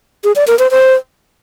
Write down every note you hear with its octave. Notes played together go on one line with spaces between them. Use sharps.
G#4
D5
A#4
C5
C5